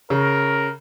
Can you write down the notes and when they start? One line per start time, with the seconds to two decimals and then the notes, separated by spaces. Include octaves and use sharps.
0.10 C#3 A#4